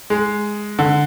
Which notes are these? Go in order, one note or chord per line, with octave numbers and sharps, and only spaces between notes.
G#3
D3